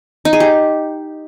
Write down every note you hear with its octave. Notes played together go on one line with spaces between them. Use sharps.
D#4
G#4
G4